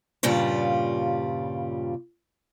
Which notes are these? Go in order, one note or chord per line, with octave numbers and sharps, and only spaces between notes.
G2 A#2 C#3 G3 F4